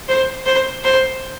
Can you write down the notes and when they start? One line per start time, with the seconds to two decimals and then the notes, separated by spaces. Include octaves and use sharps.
0.08 C5
0.46 C5
0.84 C5